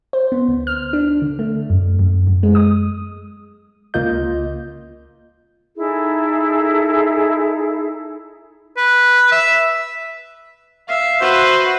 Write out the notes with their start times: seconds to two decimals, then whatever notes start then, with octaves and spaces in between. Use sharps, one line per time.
0.13 C5
0.32 B3
0.48 D2
0.67 F6
0.93 D4
1.22 D3
1.39 A3
1.70 F#2
1.99 F#2
2.27 F#2
2.43 G#3
2.55 D#6
3.94 C#2 A#3 F4 D#5 G6
5.75 D#4 E4 G#4 A4
8.77 B4
9.32 E5
10.89 E5 F5
11.21 F#4 B4 C5